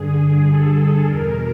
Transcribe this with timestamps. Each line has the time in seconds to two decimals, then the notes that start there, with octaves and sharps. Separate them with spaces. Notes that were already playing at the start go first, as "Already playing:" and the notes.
Already playing: G2 D3 G#4
0.19 G#4
0.48 A4
1.05 E2 B2 A#4